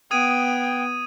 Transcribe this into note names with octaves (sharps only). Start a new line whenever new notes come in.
B3 G5 D#6 G#6 D#7